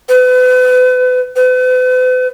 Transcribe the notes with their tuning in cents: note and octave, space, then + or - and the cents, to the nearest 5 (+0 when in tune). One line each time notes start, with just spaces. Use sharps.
B4 +35
B4 +45